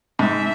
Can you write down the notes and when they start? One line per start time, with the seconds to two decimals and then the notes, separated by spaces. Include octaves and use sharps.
0.19 G#2 E5